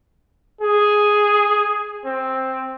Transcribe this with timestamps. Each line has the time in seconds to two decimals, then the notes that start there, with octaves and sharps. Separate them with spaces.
0.61 G#4
2.06 C4